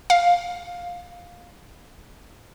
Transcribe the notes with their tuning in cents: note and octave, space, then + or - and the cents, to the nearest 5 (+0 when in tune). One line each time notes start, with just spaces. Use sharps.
F5 +10